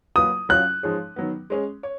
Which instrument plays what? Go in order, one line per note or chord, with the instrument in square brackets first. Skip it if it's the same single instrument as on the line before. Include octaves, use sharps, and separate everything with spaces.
[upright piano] F#3 A#3 F4 B4 [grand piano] D#6
[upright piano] F#3 C#4 F4 [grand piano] F#6
[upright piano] F3 G#3 D#4 G#4 C#5
D#3 F#3 B3
G#3 C#4 G#4
C#5